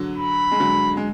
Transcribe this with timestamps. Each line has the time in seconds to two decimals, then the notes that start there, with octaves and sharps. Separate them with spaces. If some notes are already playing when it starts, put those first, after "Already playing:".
Already playing: D3 F#3
0.15 B5
0.52 G#3
0.60 D3 F#3
0.97 G#3